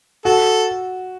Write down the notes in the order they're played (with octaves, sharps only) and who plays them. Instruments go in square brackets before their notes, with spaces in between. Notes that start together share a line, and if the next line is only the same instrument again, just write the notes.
[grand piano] F#4 [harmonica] A4